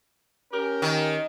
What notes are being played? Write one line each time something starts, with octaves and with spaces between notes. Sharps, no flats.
C#4 G4 A#4
D#3